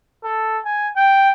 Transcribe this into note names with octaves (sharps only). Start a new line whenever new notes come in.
A4
G#5
G5